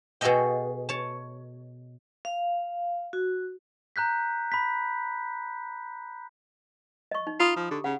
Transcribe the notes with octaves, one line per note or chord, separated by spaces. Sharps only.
B2 F#4 G#4 A4 D#5 G5
C#5 A5
F5
F#4
A#5 F#6 G6 B6
B5 B6
D#5 C#6
D#4
F4 A#5 B5 D#6
F3
D3 G4
C#3 F#5